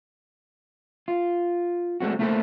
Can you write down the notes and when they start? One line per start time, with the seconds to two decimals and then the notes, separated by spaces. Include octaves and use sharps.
1.08 F4
2.00 G#3 A3 C4 F#4
2.19 A3 A#3 E4 G4 A4 C5